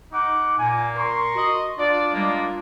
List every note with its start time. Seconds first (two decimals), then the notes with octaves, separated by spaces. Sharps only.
0.13 D#4 F#5 D6
0.59 A#2 A#3 G#5
0.96 A#4 C6 C#6
1.36 F#4 D#5
1.79 D4 F4 D5
2.13 G3 G#3 A#3